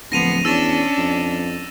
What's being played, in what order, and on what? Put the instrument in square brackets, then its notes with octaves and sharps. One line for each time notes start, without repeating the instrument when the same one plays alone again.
[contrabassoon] D1 [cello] F3 B3 [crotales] A#6 D#7 F7
[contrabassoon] E2 [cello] C#4 D4 [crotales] E6 A6 E7
[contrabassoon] F2